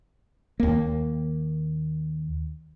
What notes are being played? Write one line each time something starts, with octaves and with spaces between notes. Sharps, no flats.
D#2 A#3